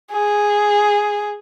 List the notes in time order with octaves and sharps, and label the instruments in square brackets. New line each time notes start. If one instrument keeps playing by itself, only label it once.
[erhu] G#4